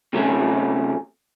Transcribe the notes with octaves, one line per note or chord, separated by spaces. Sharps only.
C3 F#3 A3 C#4